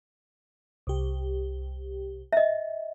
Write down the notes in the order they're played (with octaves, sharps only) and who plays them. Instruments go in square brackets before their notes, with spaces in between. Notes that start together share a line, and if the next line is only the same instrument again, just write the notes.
[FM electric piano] C2 G4
[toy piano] D#5 E5